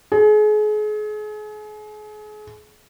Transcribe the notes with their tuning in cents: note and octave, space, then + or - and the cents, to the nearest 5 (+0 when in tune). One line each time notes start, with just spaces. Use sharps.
G#4 +35